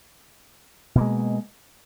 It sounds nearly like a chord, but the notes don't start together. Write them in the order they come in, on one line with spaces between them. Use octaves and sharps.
B2 A#3 G#3